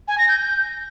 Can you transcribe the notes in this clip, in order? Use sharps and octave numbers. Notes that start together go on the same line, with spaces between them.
G#5
A#6
G6
G6